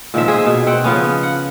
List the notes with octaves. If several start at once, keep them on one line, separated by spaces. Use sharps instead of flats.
A#2 D#3 F3 E5
D#4 G#4 C5 E5
B2
C4 F#5 G5
C#3 F3 B3 C#4
F#5